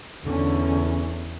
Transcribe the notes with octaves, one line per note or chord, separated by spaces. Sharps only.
E2 D3 C#4